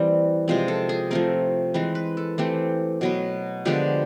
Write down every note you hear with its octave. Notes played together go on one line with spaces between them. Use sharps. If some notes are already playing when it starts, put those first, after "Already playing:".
Already playing: E3 G3 A#3 C4
C3 F3 G#3 C4
A4
G#4
F3 A3 C4 A#4
E3 G#3 C4 B4
B4
A4
E3 A3 C4 G4
B2 F#3 B3
D3 F3 G#3 B3 G4